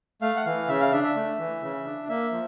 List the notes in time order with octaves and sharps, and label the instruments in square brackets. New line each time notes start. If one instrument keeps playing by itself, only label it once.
[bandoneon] A3 F5
F#5
E3 F5
C#3 E5
F5
D4 E5
E5
A3
E3
C#3
D4
A#3 E5
F3